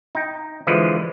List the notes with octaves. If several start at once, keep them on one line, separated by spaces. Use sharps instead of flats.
D#4 G5
D3 E3 F3 G#3 B4